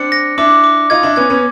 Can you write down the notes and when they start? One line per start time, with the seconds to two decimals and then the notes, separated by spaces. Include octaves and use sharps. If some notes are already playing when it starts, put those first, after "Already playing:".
Already playing: C4 D4 C#7
0.12 A#6
0.38 D4 E4 D6
0.64 D6
0.90 D#4 F4 G#6
1.03 D4 E4
1.16 B3 C#4 G#6
1.30 B3 C#4